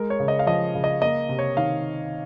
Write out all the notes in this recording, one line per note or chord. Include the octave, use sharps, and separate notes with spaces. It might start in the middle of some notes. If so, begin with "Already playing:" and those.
Already playing: G#3 A#4
C#5
C#3
D#5
F5
F3 D#5
C#3
D#5
A#3 D#5
C3
C#5
D#3 F5